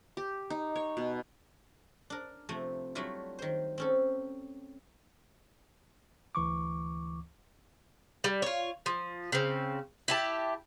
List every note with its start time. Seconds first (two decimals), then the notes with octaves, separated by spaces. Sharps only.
0.17 G4
0.50 D#4
0.76 C#5
0.97 B2
2.10 D4 A#4
2.49 C3 F3 A3
2.95 F#3 G3 A3 D4 E4 F4
3.39 D#3 C5
3.78 C4 C#4 A4
6.35 D2 E3 C#6 D6
8.24 G3
8.42 F4 C#5
8.86 F3
9.32 C#3 C4
10.08 E4 G4 A5